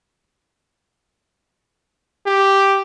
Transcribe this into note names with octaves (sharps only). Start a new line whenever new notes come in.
G4